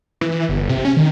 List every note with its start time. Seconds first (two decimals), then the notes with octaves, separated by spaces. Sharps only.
0.21 E3
0.49 G1
0.69 C3
0.85 C#4
0.97 D#3